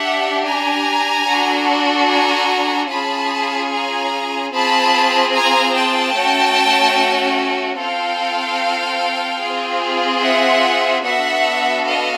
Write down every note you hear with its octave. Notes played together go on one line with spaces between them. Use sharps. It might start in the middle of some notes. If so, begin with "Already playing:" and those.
Already playing: D4 G4 E5 F#5
G#5 A#5
D4 F#4 A4
G#5 A#5
C#4 F4 G#4 A5 B5
G#5 A#5
C4 F4 G#4 A5 B5
G#5 A#5
G5 A5
A3 C#4 F#4
C4 F4 A4 F5 G5
C4 F4 G#4
E5 F#5
B3 D4 F#4 A4 E5 F#5
D#5 F5